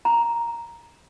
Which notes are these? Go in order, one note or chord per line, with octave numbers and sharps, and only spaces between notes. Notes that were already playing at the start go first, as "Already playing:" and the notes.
A#5